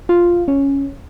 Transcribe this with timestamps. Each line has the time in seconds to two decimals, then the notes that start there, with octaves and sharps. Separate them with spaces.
0.09 F4
0.48 C#4